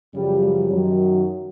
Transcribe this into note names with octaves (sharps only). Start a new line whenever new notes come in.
F#2 C#3 F3 G3
G3
F#2 D#3 F#3